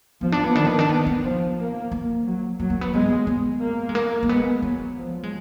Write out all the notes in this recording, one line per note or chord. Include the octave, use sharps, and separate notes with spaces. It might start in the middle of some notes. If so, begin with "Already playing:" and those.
F3 B3
D4
B3
D#3 D4
B3
D4
B3
B3
F3
A#3
A#3
F#3
F#3 A#3
A#3
B3
G#3 B3
B3
A#3
G#3
A#3
A#3
G#3 B3
F#3 B3
F3
G#3